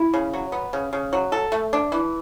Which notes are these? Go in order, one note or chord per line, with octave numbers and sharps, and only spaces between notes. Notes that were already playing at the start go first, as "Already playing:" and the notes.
Already playing: E4
C#3
F#3
B3
C#3
C#3
F#3
A4
A3
D4
E3